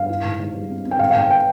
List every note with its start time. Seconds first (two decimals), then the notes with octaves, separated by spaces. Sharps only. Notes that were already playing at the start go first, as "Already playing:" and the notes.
Already playing: G2 F5
0.09 E4
0.24 G#2
0.39 G#2
0.54 G3
0.70 C4
0.85 C4
0.91 G5
0.99 G#2 F5
1.10 F5
1.15 G#2 G5
1.30 G5